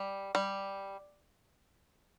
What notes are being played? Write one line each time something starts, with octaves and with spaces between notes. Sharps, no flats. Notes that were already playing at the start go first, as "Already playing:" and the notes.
Already playing: G3
G3